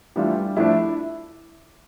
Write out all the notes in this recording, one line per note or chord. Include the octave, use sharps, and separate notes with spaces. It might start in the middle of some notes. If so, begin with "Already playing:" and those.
E3 G3 A3 D4 F4 G4
F3 A3 D4 E4